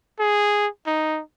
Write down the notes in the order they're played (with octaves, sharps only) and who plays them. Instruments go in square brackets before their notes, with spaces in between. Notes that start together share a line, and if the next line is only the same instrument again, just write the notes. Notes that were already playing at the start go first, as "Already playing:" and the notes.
[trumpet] G#4
D#4